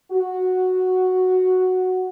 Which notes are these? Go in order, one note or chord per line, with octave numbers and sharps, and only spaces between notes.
F#4